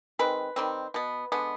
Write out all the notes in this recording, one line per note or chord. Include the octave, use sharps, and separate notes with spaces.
D#3 G#3 C4 B4
D#3 G3 C4
B2 B3
D3 G#3 B3